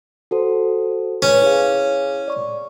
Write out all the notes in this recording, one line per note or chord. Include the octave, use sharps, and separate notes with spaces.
F#4 A4 C5
C#4 B4 G#5
E4 G#4 F5
D5 C#6